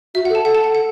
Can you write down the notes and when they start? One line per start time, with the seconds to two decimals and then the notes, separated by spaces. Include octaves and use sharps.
0.15 F#4 E5
0.25 F#5
0.30 A4
0.35 A5
0.45 A4 F#5
0.55 A5
0.64 F#5
0.75 F#5